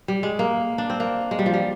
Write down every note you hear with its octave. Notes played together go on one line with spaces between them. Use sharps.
G3
G#3
A#3
D4
C4
A#3
G#3
G3
F3
G3